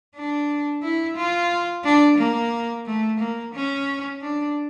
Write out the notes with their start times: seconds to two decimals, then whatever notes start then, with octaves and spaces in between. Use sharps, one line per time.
0.15 D4
0.83 E4
1.17 F4
1.84 D4
2.18 A#3
2.86 A3
3.20 A#3
3.54 C#4
4.21 D4